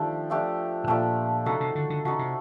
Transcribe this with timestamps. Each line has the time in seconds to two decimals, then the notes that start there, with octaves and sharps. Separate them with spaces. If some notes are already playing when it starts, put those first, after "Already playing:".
Already playing: D#3 F3 A3 D4 G4
0.30 F3 A3 D4 G4
0.84 A2
0.88 A#2 F3 A3 D4 G4
1.46 C3 D#4 F#4 A4
1.60 C3
1.75 D3
1.90 D3
2.05 C#3 D#4 F#4 A4
2.19 C3